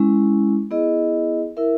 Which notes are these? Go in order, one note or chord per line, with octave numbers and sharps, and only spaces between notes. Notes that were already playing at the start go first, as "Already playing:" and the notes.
Already playing: G#3 C#4 E4
B3 E4 G#4 D#5
E4 A#4 E5